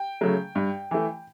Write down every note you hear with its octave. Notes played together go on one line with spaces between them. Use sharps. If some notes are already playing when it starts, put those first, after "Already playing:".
Already playing: G5
C#3 F#3 A3
G2
E3 A3